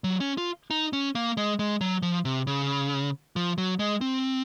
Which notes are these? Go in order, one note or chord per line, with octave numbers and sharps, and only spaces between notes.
F#3
C#4
F4
D#4
C#4
A#3
G#3
G#3
F#3
F3
C3
C#3
F3
F#3
G#3
C4